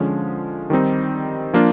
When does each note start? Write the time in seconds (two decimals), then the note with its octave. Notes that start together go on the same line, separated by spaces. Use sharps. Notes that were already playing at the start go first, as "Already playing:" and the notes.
Already playing: D3 F3 G#3 C#4
0.70 D#3 G3 C4 D#4
1.53 F3 A#3 D4 F4